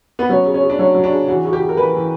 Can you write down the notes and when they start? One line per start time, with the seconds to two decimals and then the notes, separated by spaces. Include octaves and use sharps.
0.19 B3
0.29 F#3 C#4
0.45 C#3
0.54 C#4
0.62 C#3
0.70 D4
0.79 F#3 C#4
0.95 F#3
1.04 D4
1.11 C#3
1.27 E3 F#4
1.45 C#3 F#4
1.53 G4
1.61 C#3
1.69 A#4
1.77 E3 B4
1.94 E3